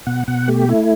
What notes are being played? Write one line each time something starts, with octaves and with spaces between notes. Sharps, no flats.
B2 F#5
B2 F#5
A3 G4
A3 E4